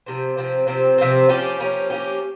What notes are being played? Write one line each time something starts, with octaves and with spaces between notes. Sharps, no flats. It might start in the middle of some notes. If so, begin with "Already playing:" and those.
C3 F3 C4
C3 F3 C4
C3 F3 C4
C3 F3 C4
F3 A#3 C#4 G4
F3 A#3 C#4 G4
F3 A#3 C#4 G4